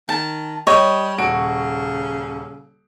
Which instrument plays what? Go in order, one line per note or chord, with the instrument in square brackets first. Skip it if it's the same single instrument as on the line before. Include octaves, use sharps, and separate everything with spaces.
[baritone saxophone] D#3 [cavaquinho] A5
[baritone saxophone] G3 [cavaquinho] C#5 [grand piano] D#5
[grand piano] D#1 F#4 D7 [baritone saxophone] C#3